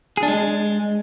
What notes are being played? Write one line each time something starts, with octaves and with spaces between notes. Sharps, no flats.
G#4
D4
G#3